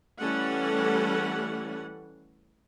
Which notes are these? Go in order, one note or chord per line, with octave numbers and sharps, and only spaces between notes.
E3 G3 A3 C#4 A4 F#5